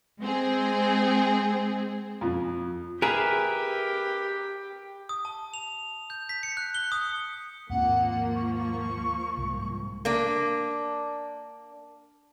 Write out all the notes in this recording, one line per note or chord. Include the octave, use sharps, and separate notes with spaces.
G#3 C4 G#4
F2
G4 G#4 A#4 B4 E5
D#6
A5
F7
G6
B6
C#7
F#6
G7
D#6
D#2 G#2 F3 A#3 C4 F#5
C#6
C2 G#2
A#3 D4